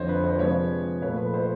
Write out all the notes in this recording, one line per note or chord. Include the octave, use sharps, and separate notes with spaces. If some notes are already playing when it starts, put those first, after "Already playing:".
Already playing: F2 D3 F3 C5 C#5 D#5
B4
C5
D5
C3 F3 G#3 B4 C#5
A#2 F3 A3 B4 C#5
B4
C5